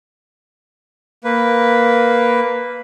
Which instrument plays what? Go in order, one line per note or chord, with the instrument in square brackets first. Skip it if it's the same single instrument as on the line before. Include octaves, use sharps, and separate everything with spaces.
[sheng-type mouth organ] A#3 B4